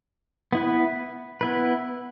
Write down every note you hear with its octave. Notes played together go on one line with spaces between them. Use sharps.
B3 E4 B4
B3 E4 B4